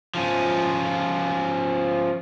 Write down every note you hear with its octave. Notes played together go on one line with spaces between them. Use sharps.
F3 C#4